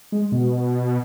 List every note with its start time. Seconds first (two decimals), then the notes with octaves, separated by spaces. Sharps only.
0.12 G#3
0.32 B2